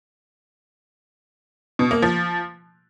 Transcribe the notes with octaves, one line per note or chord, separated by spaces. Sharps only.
B2
A#3
F3